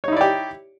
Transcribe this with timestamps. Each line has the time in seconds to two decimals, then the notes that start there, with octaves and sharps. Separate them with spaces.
0.04 C#5
0.08 D#4
0.12 E4
0.17 D5
0.21 G4